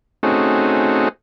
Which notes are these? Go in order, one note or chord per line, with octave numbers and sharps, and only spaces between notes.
A3 C4 C#4 D#4 F#4 G#4